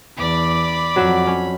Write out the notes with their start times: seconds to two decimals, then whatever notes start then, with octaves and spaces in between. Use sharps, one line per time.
0.18 E2 D5 B5 D6
0.96 F2 F#3 F#4 E5
1.27 C#4